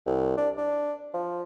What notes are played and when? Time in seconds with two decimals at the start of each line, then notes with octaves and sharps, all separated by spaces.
0.06 C2
0.37 D4
0.57 D4
1.14 F3